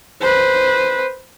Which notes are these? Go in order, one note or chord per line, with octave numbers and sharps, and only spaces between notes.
B4 C5